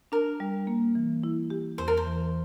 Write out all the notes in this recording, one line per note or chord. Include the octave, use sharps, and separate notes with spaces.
D4 A#4
G3
A#3
E3
E4
G4
E2 C5
A#4
C5
E3